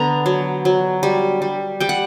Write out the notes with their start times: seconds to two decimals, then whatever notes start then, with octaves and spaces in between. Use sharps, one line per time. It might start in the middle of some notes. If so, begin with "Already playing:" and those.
Already playing: D3 B3 A#5
0.26 F#3
0.65 F#3
1.03 G3
1.42 G3
1.80 G3 G5
1.89 F#5